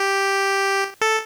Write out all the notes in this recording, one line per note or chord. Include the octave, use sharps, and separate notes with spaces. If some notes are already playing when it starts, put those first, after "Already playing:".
Already playing: G4
A4